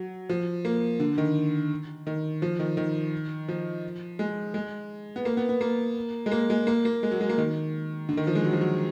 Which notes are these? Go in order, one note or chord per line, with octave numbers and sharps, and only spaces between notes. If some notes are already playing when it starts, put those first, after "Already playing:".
Already playing: F#3
F3
A#3
D3
D#3
D#3
F3
D#3
D#3
F3
G#3
G#3
B3
A#3
B3
B3
A#3
G#3
A#3
G#3
A#3
A#3
G#3
F#3
G#3
A#3
D#3
D3
D#3
F3
G#3
F#3
F3
F#3